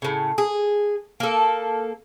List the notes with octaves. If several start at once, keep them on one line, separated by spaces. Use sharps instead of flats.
A2 C#3
G#4
A#3 A4